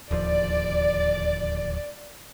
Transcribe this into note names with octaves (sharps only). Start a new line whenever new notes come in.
D1 D#2 F3 D5